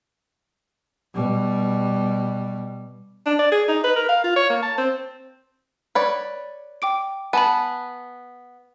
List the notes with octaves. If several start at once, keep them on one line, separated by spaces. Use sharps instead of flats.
B2 G3
D4
D5
G#4
D#4
B4
A#4
F5
F4
C#5
A#3
A5
C4
B4 C#5 D5
G5 D6 D7
B3 G#5 A5 B5